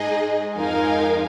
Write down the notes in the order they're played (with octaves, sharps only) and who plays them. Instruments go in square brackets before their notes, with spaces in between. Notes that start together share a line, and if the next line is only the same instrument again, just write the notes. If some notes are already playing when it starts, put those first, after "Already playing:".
Already playing: [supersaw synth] G#2 G#3 [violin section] D#4 G#4 D#5
[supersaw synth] F2 F3 [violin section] D#4 A#4 F5 G#5